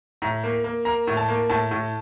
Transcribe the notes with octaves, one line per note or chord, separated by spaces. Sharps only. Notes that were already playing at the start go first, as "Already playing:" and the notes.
A2 A#5
A#3
A#3
A#3 A#5
A2
A5
A#3
A2 A5
A2